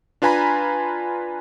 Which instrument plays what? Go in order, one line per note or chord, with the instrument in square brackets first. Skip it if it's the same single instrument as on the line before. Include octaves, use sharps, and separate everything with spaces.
[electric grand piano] D4 F4 B4 G#5 A#5 B5